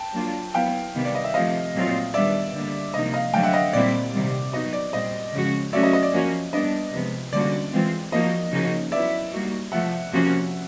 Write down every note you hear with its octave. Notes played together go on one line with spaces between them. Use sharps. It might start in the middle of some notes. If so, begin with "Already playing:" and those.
Already playing: G5 A5
F#3 A#3 D4 F4
F#3 B3 E4 F5 G5
C3 D#3 G3 B3
D5
D#5
E5
C3 F3 A3 D#5 F5
A#2 F#3 A3 C4 F4
D#3 G3 B3 D4 D5 E5
D3 G3 A#3
C3 F3 A#3 D#4 D#5
D#5 F5
D3 F#3 A3 F5 G5
E5 F#5
D#5 F5
A#2 G3 C4 E4 D5
C3 D#3 G3
F#3 B3 D#4 F#4 D#5
D5
A#2 G3 C4 D#5
C#3 F3 G#3 C#4 F#4
F#3 A3 C#4 F#4 D5 E5
D#5
D#5
D5
F3 A#3 C#4 F#4
G3 B3 D4 D#5
C3 F3 G#3 B3
D3 G3 A#3 C#4 F#4 D5
E3 G#3 C4 F4
F3 A#3 D#4 F#4 D#5
C#3 F3 A#3 D#4 F#4
F#3 B3 E4 D5 E5
G3 A#3 D#4 F#4
C3 F3 A3 E5 F#5
C3 F3 A#3 C#4 F#4